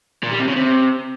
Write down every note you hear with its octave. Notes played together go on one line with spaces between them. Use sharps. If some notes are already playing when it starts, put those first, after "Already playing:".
A#2
G3
C3
C#3
C3